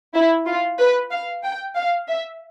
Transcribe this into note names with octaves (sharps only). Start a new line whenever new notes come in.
E4
F4
B4
F5
G5
F5
E5